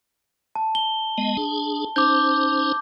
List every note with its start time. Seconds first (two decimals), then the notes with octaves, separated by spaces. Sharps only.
0.55 A5
0.75 G7
1.18 G#3 B3 D#5
1.37 D4 G#4
1.96 C#4 D#4 C5 D6 G6